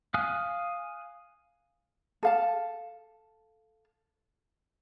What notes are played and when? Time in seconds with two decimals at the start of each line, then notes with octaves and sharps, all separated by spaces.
0.14 F5 G#5 D#6 F6 F#6
2.23 A4 F5 A5